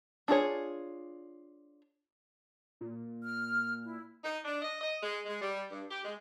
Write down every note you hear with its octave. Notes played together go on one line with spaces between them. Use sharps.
D4 F4 G#4 C#5
A#2
F6
E4
D#4
D4
D#5
D#5
G#3
G#3
G3
G2
G4
G#3